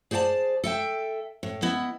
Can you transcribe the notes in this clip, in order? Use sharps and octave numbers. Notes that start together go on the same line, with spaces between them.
G#4 C5 D5 F#5 A5
A4 E5 G5
A2
B3 E4 D#5